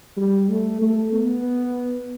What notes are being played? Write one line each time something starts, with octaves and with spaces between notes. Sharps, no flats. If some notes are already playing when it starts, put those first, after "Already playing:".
G3
A3
A3
B3